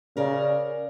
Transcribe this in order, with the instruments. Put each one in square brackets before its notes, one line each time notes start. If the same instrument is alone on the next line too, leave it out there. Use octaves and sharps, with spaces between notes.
[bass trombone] C#3 [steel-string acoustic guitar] A#4 D5